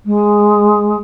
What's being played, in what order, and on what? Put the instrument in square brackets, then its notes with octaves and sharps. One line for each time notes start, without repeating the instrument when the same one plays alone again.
[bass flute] G#3